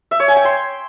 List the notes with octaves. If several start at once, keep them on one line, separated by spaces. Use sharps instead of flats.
E5
C#5
G#5
G5
C6